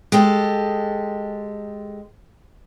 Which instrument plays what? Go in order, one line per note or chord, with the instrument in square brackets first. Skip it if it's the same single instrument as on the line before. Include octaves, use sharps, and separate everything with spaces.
[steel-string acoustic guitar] G#3 G4 A4